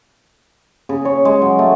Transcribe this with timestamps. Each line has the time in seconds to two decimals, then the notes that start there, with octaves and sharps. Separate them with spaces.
0.89 C#3
1.05 C#5
1.25 G#3
1.42 F#3
1.59 A3